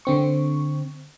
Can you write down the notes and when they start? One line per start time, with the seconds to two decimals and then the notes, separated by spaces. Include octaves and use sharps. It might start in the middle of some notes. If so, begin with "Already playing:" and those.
0.05 D3 C4 C#6